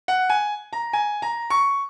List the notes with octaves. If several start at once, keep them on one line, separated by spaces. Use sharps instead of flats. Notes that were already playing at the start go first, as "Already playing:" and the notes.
F#5
G#5
A#5
G#5
A#5
C#6